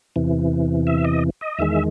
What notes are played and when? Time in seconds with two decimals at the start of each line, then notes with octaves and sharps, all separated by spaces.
0.16 E2 C3 E3
0.87 E5
1.05 D#5
1.41 D#5
1.59 E2 D#3 G#3 E5